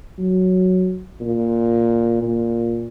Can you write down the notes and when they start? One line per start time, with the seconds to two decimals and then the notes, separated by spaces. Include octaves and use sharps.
0.18 F#3
1.20 A#2
2.22 A#2